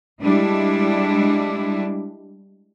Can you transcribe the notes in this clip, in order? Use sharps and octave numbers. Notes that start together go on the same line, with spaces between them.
G3 G#3 D4 E4